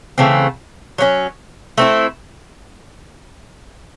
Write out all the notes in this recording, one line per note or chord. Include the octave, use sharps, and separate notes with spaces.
C#3 E3 A3 C4
F#3 A#3 C#4
A3 C4 E4